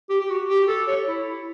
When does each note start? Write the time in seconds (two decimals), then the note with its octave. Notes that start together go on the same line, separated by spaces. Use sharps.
0.10 G4
0.21 G4
0.30 F#4
0.48 G4
0.68 A4
0.88 C#5
1.07 E4
1.26 E4